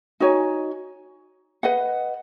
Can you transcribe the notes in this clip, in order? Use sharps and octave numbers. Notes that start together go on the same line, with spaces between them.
D#4 F#4 C#5 G#5
B4 D#5 F#5